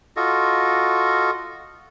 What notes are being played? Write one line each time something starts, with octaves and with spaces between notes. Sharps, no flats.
F4 F#4 A4 D#5